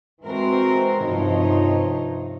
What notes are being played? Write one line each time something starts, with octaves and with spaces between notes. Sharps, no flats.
E3 G#3 C4 F#4 A#4 C5
G2 C3 F3 D#4 C#5